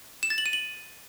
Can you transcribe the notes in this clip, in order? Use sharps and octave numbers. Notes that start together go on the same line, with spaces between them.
E7
A6
F#7
D#7
F#7